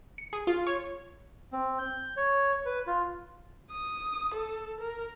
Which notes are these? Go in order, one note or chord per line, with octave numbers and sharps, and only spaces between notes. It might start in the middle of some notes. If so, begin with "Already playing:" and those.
C#7
G#4
F4
C#5
C4
G6
C#5
B4
F4
D#6
A4
A#4